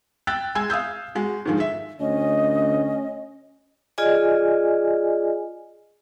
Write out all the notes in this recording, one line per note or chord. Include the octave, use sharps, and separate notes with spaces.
G5 E6 F#6 A6
G#3 G#5 E6 G#6
F5 D#6 E6 G6
G#3 F#4
G#2 D3 D#3 F3 G#3
E5
D2 C#4 D#5
F4 G#4 D5 D#5 G#5